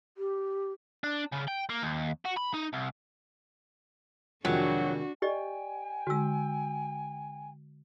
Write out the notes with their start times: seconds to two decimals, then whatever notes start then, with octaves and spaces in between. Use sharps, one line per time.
0.17 G4
1.04 D4
1.32 C#3
1.48 G5
1.70 A#3
1.82 D#2
2.25 F#4
2.37 B5
2.53 D#4
2.73 C2
4.45 F2 C3 D#3 F#3 G#3 D4 F#4
5.22 G4 D5 D#5 G5 G#5
6.07 D3 G#3 F#4 E6